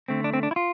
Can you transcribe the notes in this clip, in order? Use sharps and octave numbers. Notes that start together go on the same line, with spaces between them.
D3 A3 C4
D4
C4
D4
E4
F4